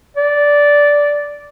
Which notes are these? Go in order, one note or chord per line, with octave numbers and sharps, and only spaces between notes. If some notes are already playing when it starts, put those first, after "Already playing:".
D5